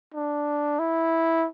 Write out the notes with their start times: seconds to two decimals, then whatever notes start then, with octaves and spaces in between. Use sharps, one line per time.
0.14 D4
0.79 E4